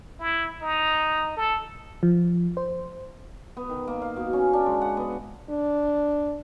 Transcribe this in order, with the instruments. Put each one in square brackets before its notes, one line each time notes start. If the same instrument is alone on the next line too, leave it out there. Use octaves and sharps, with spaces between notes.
[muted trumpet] E4
D#4
A4
[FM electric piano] F3
C5
[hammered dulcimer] B3
D#3
A#3
F5
B2
C#4
D4
G#3
F#5
B3
[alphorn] D4